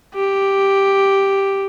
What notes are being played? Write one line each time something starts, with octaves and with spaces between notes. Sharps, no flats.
G4